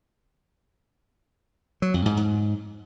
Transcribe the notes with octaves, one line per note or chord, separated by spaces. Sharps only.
F#3
F2
G#2
G#2